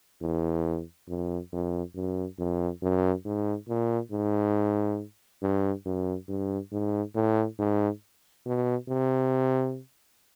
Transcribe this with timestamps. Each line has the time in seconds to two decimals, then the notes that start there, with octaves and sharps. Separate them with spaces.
0.22 E2
1.08 F2
1.52 F2
1.95 F#2
2.39 F2
2.82 F#2
3.25 G#2
3.69 A#2
4.12 G#2
5.42 G2
5.86 F#2
6.28 G2
6.72 G#2
7.15 A2
7.59 G#2
8.46 B2
8.88 C3